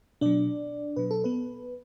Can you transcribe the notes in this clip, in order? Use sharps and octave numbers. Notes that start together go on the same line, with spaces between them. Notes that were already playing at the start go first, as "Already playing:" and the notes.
B2 F#3 D4 D5
B2 F#3 B4
A4
B3 B4